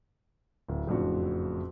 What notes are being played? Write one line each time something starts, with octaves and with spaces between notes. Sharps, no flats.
D1
F#1 F2 A2 D4 F#4